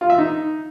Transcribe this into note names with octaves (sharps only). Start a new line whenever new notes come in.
F4
E5
D#4